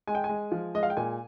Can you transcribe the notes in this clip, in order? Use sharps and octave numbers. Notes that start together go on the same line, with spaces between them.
G#3 G#5
G5
G#5
G#3
F3
G#3 D#5
F5
G5
A#2 G#5